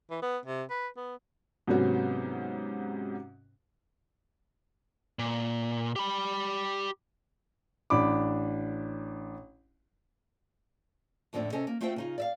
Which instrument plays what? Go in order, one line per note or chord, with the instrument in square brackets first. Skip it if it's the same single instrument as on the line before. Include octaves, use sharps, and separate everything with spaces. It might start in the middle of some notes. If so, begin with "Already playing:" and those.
[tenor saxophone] E3
B3
C3
B4
B3
[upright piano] G#2 C3 F#3 B3 C#4 F#4
[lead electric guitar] A#2
G4 B5
[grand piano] A1 D4 B5 D6
[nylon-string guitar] F2 A2 D3 C4 D5
C3 C#4 A4 D#5 G#5
A#3
A3 C4 F4 F#4 C5 G5
C#3 D#4 F4
D5 E5 F5